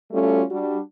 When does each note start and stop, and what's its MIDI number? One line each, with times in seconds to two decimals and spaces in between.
0.12 0.42 55
0.12 0.42 57
0.12 0.42 61
0.12 0.42 65
0.12 0.42 66
0.12 0.42 69
0.51 0.79 55
0.51 0.79 62
0.51 0.79 66